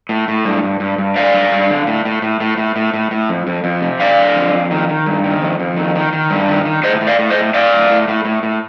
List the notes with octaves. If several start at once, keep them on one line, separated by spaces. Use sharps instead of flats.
A2
A2
G2
G2
G2
G2
D3 D5 F5
G2
G2
D3
A2
A2
A2
A2
A2
A2
A2
A2
F2
F2
F2
C3
D3 D5 F5
D3
F2
F2
D#3
D#3
G2
D#3
F2
F2
D#3
D#3
D#3
G2
D#3
D#3
A2 C5 D#5
A2
D5 F5
A2
C5 D#5
A2
A2 D5 F5
A2
A2
A2
A2
A2